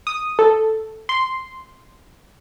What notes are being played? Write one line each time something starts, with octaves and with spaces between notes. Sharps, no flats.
D#6
A4
C6